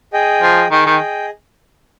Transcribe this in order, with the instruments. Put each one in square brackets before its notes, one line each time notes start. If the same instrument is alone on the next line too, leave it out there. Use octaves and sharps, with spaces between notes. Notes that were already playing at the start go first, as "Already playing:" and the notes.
[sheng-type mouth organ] G#4 D#5 G5
[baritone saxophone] F3
[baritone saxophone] D#3 [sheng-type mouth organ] G#4 D#5 G5
[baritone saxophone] D#3